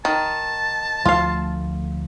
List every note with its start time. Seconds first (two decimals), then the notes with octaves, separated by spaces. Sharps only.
0.05 D#3 A5
1.05 D2 F3 A3 F4 F5